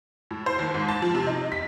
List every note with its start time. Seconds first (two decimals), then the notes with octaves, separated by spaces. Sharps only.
0.31 A2
0.46 C5
0.59 D#2
0.74 G#2
0.88 A5
1.02 F3
1.15 C3
1.27 D#4
1.52 B6